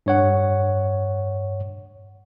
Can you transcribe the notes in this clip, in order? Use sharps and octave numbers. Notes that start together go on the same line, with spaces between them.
G2 C#5 F#5